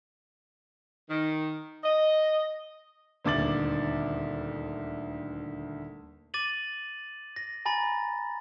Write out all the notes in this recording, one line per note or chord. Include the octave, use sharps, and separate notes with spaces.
D#3
D#5
D#1 D2 D6 A6 F#7
D6 A6 D#7 F#7
A#6
G#5 A#5 B5 A6